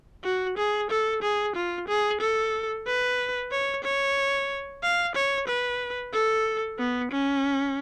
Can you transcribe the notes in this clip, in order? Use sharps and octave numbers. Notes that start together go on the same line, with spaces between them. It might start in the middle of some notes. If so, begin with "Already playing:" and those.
F#4
G#4
A4
G#4
F4
G#4
A4
B4
C#5
C#5
F5
C#5
B4
A4
B3
C#4